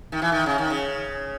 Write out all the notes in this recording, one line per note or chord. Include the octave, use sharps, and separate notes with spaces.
D#3
E3
D#3
C#3
D#3
C#3